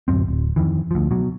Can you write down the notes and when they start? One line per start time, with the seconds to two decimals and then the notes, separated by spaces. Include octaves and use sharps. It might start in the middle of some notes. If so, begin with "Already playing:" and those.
0.08 D1 G#1 F#2 C4
0.28 D1
0.56 F2 D#3 E3
0.91 D2 F3
1.11 B2 F#3